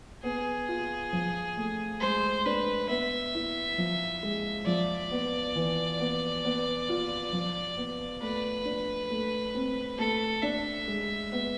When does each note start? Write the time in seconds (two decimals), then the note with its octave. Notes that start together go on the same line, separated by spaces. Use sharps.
0.23 B3 G#4
0.69 F4
1.13 F3
1.57 A3
2.01 G#3 C5
2.46 D4 B4
2.89 B3 E5
3.35 E4
3.78 F3
4.23 G#3
4.67 F3 D5
5.11 B3
5.55 E3
6.00 B3
6.45 B3
6.89 F4
7.33 F3
7.77 B3
8.21 A3 B4
8.65 D4
9.10 A3
9.55 C4
9.98 A3 A4
10.43 D4 E5
10.88 G#3
11.32 B3